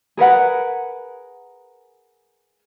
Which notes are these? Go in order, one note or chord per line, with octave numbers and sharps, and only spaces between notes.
G#4 A#4 B4 F#5